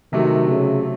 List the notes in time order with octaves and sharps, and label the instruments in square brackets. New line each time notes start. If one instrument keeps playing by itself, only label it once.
[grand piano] C3 F#3 A3 [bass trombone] D#3
[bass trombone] C#3